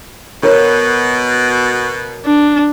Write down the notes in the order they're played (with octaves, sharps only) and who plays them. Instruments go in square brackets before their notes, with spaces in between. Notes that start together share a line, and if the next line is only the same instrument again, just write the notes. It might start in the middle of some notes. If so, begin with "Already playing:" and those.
[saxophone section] B2 [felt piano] A#4 C#5
[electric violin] D4